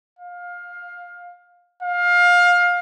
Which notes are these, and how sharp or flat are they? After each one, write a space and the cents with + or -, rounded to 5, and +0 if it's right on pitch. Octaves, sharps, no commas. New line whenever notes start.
F5 +20
F5 +20